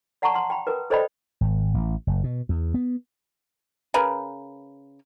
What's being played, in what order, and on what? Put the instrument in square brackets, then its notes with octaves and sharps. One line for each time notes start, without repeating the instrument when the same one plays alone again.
[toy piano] D5 F#5 A5 A#5 C#6
F#5 C6
G5 B5
A#4 B4
A4 C5 D5 D#5 G5 B5
[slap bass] G#1
A1
F#1
B2
E2
B3
[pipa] C#3 A#4 B4